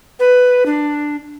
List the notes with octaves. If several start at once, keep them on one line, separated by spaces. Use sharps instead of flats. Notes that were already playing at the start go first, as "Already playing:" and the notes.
B4
D4